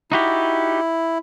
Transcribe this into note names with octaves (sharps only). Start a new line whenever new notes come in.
D#4 E4 F#4 G4